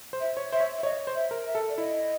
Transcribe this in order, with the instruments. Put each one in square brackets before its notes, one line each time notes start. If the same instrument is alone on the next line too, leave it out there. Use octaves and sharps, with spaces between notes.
[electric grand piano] C5
[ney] E5
[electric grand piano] C#5
[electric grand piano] C5 [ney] E5
[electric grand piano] C#5
[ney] E5
[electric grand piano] C#5 [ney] D#5
[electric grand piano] C5
[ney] E5
[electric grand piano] A#4
[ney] E5
[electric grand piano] A4
[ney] D5
[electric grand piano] E4 [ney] D#5